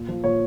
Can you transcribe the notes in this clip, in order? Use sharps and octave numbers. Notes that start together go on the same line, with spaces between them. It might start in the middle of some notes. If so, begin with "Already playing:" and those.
Already playing: A#2
F3
A#2 C#5